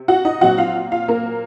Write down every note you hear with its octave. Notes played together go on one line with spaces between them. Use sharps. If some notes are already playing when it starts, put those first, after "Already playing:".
Already playing: C3
F#4 F#5
D#4 D#5
A#2 F#3 C4 F#4 F#5
F4 F5
F4 F5
A#3 A#4